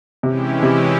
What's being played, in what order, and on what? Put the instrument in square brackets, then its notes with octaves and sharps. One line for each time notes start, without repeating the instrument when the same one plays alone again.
[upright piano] C3 [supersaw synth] E3 G#3 C#4 E4 G4
[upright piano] C3